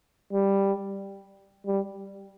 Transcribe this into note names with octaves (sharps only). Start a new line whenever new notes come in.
G3
G3